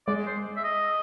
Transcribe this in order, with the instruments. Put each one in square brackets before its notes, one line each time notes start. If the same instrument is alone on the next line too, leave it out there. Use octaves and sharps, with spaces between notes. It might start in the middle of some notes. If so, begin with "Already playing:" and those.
[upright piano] G#3 [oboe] D5
[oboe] C5
E5
D#5